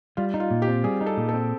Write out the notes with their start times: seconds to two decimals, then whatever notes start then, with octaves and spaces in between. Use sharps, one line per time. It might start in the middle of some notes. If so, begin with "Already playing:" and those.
0.17 G3 F4
0.34 D#4
0.40 F4
0.51 A#2
0.62 G4
0.68 C4
0.84 G3 G#4
1.01 D#4
1.06 A4
1.17 A#2
1.29 A4
1.34 C4